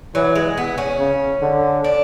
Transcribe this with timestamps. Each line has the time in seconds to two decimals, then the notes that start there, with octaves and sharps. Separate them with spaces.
0.15 E3 F#3
0.35 G#3
0.57 B3
0.78 C#4
0.99 C#3
1.42 D3
1.84 D4